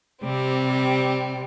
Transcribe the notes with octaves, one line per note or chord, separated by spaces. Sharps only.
C3 G3 C4